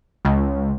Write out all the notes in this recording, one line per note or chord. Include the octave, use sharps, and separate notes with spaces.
C#2